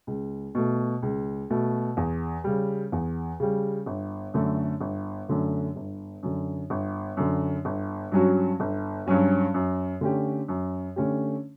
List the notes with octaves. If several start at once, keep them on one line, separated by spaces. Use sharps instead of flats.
C#2
B2 A3
C#2
B2 A3
E2
C#3 G3
E2
C#3 G3
G1
F#2 D3 A3
G1
F#2 D3 A3
G1
F#2 D3
G1
F#2 D3
G1
G2 F#3 C#4 F#4
G1
G2 F#3 C#4 F#4
F#2
D3 A3 C#4 G4
F#2
D3 A3 C#4 G4